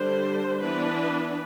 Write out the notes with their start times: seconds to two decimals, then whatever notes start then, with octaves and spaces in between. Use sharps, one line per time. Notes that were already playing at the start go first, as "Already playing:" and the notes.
Already playing: D3 G3 D4 C5
0.61 E3 B3 D4 B4